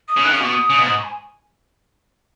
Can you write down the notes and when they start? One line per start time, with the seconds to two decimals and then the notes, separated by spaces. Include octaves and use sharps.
0.08 D#6
0.17 C#3
0.24 D#3 F#6
0.32 C#3 D#6
0.40 B2 C#6
0.52 D#6
0.70 C#3
0.78 B2
0.86 G#2 D#6
0.98 C#6
1.04 G#5